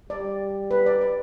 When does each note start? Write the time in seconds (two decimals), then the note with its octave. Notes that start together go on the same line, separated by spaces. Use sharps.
0.10 G3 D5
0.71 B4
0.86 D5
1.01 D5